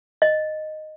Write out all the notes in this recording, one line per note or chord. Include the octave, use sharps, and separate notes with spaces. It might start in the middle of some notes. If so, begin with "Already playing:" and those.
D#5